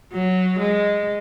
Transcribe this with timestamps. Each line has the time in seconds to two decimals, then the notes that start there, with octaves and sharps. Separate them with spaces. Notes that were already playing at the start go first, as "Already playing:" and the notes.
0.13 F#3
0.59 G#3